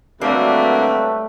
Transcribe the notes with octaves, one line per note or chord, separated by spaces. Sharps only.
D2 F#3 G3 A3 A#3 C4 B4